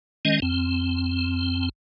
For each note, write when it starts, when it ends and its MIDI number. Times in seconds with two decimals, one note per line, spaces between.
0.25 0.40 51
0.25 0.40 56
0.25 0.40 61
0.25 0.40 75
0.42 1.69 41
0.42 1.69 60